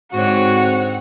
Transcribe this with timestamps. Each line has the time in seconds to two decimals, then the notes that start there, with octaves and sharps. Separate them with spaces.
0.13 G#2 D3 G#3 C4 F#4 C#5 F#5